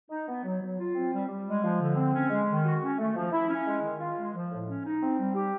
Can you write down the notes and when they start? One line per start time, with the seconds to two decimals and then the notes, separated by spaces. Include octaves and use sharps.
0.10 D#4
0.28 B3
0.45 F#3
0.62 F#3
0.79 F4
0.95 C4
1.12 G3
1.29 G3
1.47 G#3
1.63 F3
1.80 D3
1.96 C4
2.14 C#4
2.30 G#3
2.48 D#3
2.64 F#4
2.82 C#4
2.98 A3
3.15 F3
3.31 E4
3.49 C#4
3.65 G#3
3.82 D#3
3.99 F4
4.16 G#3
4.34 F3
4.51 A2
4.67 C#4
4.84 D#4
5.01 C4
5.19 G3
5.35 G4